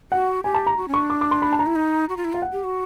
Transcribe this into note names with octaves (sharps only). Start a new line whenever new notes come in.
F#4 F#5
G4 G#5
A5
A#5
F#4
C#4
D4 C#6
D6
D6
C6
B5
A5
A#5
E4
D#4
F#4
F4
E4
F4 F5
F#5
G4
F#4